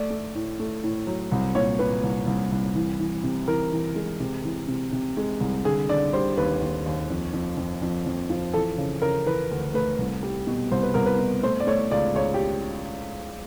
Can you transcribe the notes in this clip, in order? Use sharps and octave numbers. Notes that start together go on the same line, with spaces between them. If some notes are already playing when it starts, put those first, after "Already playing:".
Already playing: A3 D5
A3
A2
A3
A2
F#3
C2
A#2 C#5
A#2 B4
C2
C2
C2
E3
E3
C3
E3 A#4
E3
G#3
C3
E3
C3
C3
G#3
C2
D3 G#4
D3 D5
G3 C5
D#2 B4
D#2
D#2
F2
F2
F2
F2
F2
F3
E3 A4
C#3
C#3 A#4
E3 B4
D2
A3 B4
C2
G3
B2
C2 C5
B4
C2 A#4
B4
B2
A3 C5
D5
A3 C#5
C#2 D5
C#2 C#5
G4